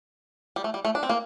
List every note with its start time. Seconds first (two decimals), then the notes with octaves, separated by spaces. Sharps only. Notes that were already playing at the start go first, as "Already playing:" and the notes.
0.56 G3
0.64 A3
0.74 G3
0.85 A3
0.95 D4
1.03 C4
1.09 A#3